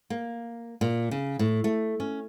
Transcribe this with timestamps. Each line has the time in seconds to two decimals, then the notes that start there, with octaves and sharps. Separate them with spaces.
0.10 A#3
0.81 A#2
1.11 C#3
1.39 A2
1.64 A3
2.00 C#4